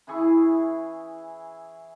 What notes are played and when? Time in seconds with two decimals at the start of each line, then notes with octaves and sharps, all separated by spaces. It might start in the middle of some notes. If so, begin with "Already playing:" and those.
0.07 E3 E4 G#4 C#6